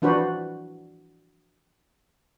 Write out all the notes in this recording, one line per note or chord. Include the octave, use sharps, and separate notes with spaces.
E3 F3 D4 F#4 B4 C5